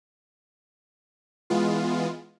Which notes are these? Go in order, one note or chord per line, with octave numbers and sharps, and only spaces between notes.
E3 G#3 B3 F4